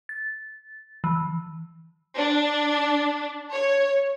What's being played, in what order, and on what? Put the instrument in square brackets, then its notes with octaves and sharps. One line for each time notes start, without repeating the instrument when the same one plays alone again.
[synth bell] A6
E3
[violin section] D4
C#5